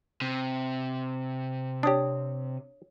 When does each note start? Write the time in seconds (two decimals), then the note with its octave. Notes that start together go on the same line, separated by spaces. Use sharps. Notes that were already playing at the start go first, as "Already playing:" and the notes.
0.22 C3
1.83 D4 G4 C#5 D#6